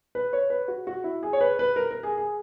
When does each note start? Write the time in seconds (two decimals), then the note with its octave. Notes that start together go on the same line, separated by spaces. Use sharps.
0.15 B4
0.33 C#5
0.50 B4
0.68 F#4
0.87 F#4
1.04 E4
1.23 G#4
1.33 C#5
1.41 B4
1.59 B4
1.76 A#4
1.91 A#4
2.03 G#4
2.17 G#4